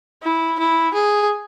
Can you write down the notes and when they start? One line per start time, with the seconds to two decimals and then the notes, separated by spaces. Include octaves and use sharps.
0.24 E4
0.59 E4
0.94 G#4